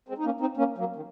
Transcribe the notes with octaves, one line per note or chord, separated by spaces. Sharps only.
G#3 C4
D#4
A#3 C#4
C4 D#4
A#3 C#4
F#3 A#3
D#3